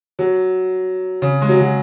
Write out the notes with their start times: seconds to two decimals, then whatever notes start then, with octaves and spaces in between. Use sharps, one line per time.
0.19 F#3
1.22 C#3
1.42 G#3
1.49 F#3
1.61 F#3